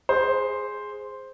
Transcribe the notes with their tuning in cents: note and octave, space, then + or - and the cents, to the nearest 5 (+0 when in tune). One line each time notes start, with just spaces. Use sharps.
G#4 +0 C5 +0